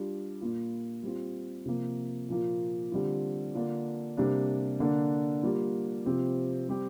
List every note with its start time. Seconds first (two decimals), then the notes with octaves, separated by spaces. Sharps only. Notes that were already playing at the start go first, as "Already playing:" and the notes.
Already playing: G3 D4 F4
0.41 A#2 A#3 F4
1.03 G3 C4 F4
1.66 C3 F3 A#3
2.29 A#2 F3 A#3 F4
2.92 D3 G3 C4 F4
3.55 D3 A#3 D4 F4
4.17 C3 G3 A#3 D4
4.80 D3 A#3 D4
5.43 G3 A#3 F4
6.06 C3 F3 C4 G4
6.69 G3 C4 G4